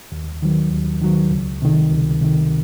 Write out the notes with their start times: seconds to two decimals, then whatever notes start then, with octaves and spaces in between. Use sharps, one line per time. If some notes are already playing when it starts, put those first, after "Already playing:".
0.12 D#2
0.42 D#3 F#3
0.71 D#2
1.02 D#3 F#3
1.31 C#2
1.62 C3 D#3
1.92 C#2
2.21 C3 D#3